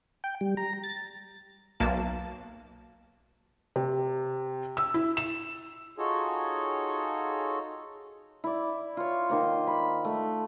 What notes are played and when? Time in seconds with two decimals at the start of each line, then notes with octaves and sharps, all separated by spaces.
0.24 G5
0.41 G3
0.57 A#5
0.83 A6
1.80 B1 A#3 A5
3.76 C3
4.77 E6
4.94 E4
5.17 E7
5.98 D#4 F4 F#4 G#4 A4 C#5
8.44 E4 D5
8.97 F4 C#5
9.30 D#3 A#3 C5
9.67 B5
10.05 A3